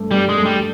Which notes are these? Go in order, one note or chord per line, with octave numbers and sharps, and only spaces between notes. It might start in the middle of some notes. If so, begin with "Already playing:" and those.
Already playing: G2 A3
G2 G3
G#3
A3
G3